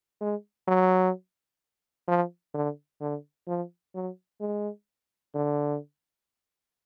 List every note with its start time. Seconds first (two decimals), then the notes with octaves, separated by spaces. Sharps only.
0.21 G#3
0.68 F#3
2.08 F3
2.54 D3
3.01 D3
3.48 F3
3.95 F#3
4.41 G#3
5.35 D3